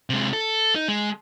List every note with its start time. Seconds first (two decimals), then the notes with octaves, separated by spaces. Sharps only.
0.10 C3 G#3
0.33 A4
0.75 D#4
0.88 G#3